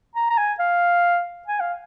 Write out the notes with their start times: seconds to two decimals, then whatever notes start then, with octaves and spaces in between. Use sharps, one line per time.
0.15 A#5
0.30 A#5
0.38 G#5
0.59 F5
1.48 G#5
1.61 F5